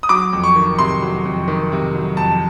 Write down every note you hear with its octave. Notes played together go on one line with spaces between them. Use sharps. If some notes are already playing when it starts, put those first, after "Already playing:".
D#6
F#3 D6
F2
C#6
D#3
C3 C6
F#3
F2
D#3
C3
F#3
F2 A5